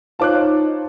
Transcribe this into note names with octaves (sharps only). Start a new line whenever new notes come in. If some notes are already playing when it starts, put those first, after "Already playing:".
D#4 F4 C5 C#5 A5 D6 F#6